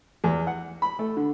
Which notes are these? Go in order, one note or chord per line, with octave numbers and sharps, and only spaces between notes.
E2
F#5
B5
A3
D3